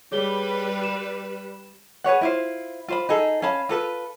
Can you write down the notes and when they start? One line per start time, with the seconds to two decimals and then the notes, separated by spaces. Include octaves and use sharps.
0.12 G3 G#4 B4 C#5 G7
0.84 E7
2.04 G#4 B4 C#5 F#5
2.21 E4 F4 C5
2.88 F4 C5 B5
3.09 D#4 G#4 A4
3.42 C#4 F5 A5 B5
3.69 F4 A4 B4